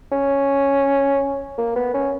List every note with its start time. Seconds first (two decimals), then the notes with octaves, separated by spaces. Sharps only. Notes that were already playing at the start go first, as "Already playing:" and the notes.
0.12 C#4
1.58 A#3
1.76 B3
1.94 C#4